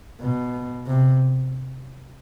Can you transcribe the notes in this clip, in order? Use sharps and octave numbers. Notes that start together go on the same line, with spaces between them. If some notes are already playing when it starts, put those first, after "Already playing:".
B2
C3